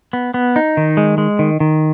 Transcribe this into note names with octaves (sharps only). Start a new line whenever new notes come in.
B3
B3
D#4
D#3
G#3
G#3
D#3
D#3